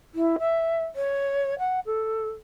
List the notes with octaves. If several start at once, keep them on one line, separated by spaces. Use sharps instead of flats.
E4
E5
C#5
F#5
A4